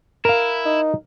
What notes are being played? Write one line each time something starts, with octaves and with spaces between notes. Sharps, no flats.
E4 A#4 F5
D#4